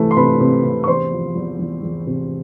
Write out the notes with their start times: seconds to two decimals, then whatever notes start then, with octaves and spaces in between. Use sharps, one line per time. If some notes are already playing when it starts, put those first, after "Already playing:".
Already playing: C3 E3 A3 B4
0.11 C6
0.16 C3 B4 B5
0.40 C3
0.64 C3
0.84 C#6
0.88 E2 C5 C6
1.12 F3
1.35 E2
1.59 E2
1.82 E2
2.07 C3